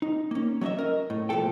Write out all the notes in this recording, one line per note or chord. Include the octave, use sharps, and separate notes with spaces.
D#4
A#3 C#4
F#3 C#4 C#5 D#5 E5
A#4 D#5
A2
C2 A#2 E3 F3 A4 G5